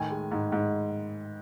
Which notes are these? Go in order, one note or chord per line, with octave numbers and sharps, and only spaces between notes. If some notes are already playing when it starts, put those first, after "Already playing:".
Already playing: A2 D#3 G#5
G#3
G#2
G#2